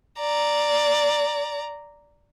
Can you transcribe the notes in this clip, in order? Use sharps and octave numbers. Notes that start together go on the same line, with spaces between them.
D5 A#5